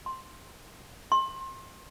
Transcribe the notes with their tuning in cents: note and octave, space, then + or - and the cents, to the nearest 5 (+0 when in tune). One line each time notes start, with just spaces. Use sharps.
C6 +5
C6 +30